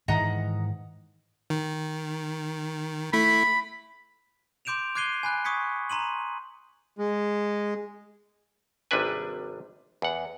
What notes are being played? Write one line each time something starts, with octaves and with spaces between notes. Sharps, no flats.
G#2 D#3 E3 D#5 F#5 A#5
D#3
A3 E4 B5
C6 D6 G6 D7 E7 F7
D6 F#6 G#6 C7 D#7 G7
G#5 B5 F#6
C#6 D#6 G#6 B6 C#7
A#5 C6 D#7 F#7
G#3
G#1 C3 G3 D4 B4 G#5
E2 F#5